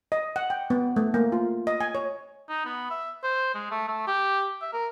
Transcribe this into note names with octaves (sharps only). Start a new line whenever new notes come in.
D#5
F#5
G5
B3
A3
A#3
F4
D#5
G#5
C#5
D#4
B3
E5
C5
G#3
A3
A3
G4
E5
A#4